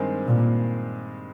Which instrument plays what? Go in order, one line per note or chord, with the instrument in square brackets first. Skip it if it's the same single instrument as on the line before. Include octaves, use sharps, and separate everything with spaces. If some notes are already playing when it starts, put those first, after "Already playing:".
Already playing: [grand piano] G2 D#3 G#3 C4
[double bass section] A#2